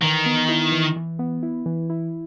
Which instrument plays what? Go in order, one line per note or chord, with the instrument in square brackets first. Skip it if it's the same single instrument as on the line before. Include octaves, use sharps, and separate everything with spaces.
[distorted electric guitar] D#3 [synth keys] E3
[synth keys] B3
E4
E3
E3
B3
E4
E3
E4